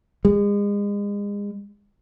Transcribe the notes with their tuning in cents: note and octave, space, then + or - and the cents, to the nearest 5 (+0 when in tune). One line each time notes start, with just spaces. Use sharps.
G#3 -35